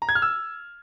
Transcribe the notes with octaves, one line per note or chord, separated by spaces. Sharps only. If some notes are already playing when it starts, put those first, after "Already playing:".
A#5
G#6
F6
E6